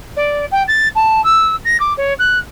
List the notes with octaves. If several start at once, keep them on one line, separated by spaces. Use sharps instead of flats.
D5
G5
A6
A5
E6
A#6
D6
C#5
F#6